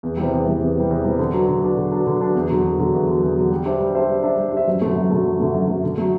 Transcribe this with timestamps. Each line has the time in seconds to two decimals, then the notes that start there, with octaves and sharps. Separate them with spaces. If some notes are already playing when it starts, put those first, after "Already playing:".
0.03 E2
0.17 C3 E3 G3
0.33 E2
0.46 C3 E3 G3
0.61 E2
0.76 C3 E3 G3
0.90 E2
1.05 C3 E3 G3
1.19 D3
1.33 F#3 B3 D4
1.48 D3
1.62 F#3 B3 D4
1.77 D3
1.92 F#3 B3 D4
2.07 D3
2.20 F#3 B3 D4
2.35 E2
2.50 D3 F#3
2.64 E2
2.79 D3 F#3
2.93 E2
3.07 D3 F#3
3.23 E2
3.36 D3 F#3
3.51 G3
3.66 D4 G4 C5 E5
3.80 G3
3.95 D4 G4 C5 E5
4.10 G3
4.23 D4 G4 C5 E5
4.38 G3
4.52 D4 G4 C5 E5
4.67 F#2
4.81 D3 F#3 A3
4.96 F#2
5.11 D3 F#3 A3
5.26 F#2
5.40 D3 F#3 A3
5.54 F#2
5.68 D3 F#3 A3
5.84 D3
5.98 F#3 A3